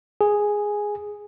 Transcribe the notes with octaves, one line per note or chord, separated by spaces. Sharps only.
G#4